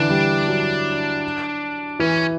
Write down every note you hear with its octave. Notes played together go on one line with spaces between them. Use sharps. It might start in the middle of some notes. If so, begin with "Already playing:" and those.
Already playing: D3 E3 D4
G3
F#3
E3 C#4